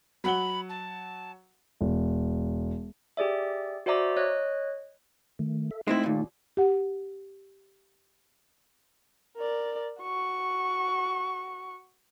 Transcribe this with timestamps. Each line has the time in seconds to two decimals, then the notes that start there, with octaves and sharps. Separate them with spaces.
0.24 F#3 F#5 B5 G7
0.69 A5
1.81 E1
3.17 G4 G#4 D5 E5
3.86 F#4 C5 D5 E5 A#5 D6
4.17 C#5 D#5 F#6
5.39 D#3 A3
5.71 A4 E5
5.88 G#3 A3 C4 D#4 E4
6.03 D#2 A#2
6.57 G4 F#5
9.37 A#4 D5
10.02 F#4 C#6